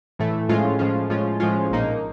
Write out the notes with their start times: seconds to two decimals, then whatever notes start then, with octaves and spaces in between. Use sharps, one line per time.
0.19 A2 E3 A3
0.49 A2 F3 G#3 C#4 F4
0.79 A2 F3 G#3 C#4 F4
1.10 A2 F3 G#3 C#4 F4
1.40 A2 F3 G#3 C#4 F4
1.70 A#1 A#2 F3 A#3 D#4